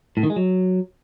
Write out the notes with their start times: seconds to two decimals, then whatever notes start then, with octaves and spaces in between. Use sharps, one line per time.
0.17 A2
0.23 D#3
0.30 G#3
0.36 F#3